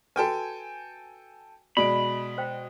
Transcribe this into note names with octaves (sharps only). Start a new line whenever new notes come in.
F#4 A4 B4 G5 G#5
B2 G#3 D5 B5 D7
C5 G5